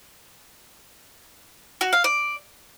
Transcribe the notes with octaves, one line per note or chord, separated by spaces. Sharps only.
F#4
F5
D5